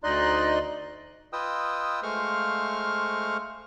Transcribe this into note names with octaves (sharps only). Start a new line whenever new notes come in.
D2 D#4 D5 D#5 C6 F#6
F4 B4 D#5 G5 D#6 E6
G#3 A3 C5 F5 C#6 F6